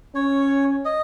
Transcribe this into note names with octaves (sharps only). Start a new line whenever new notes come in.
C#4 C#5
D#5